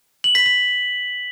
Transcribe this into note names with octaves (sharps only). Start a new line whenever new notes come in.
F#7
B6
B6